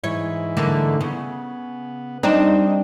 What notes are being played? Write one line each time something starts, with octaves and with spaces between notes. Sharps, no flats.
G#2 E3 E4 C#5
D3 A3 A#3
C#3 B3
G3 C4 D4 D#4